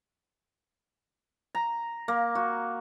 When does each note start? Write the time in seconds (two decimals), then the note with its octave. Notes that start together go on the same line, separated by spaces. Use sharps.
1.55 A#5
2.08 A#3
2.35 F#4